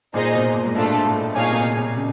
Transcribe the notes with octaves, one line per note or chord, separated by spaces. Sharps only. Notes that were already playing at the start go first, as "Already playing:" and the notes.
A#2 D#4 G#4 C5 D#5
B2
A#2
G#2
A2 A3 D4 F4 A4
A2
A#2 D#4 G#4 C#5 F5 G#5
C3
B2
C3
C#3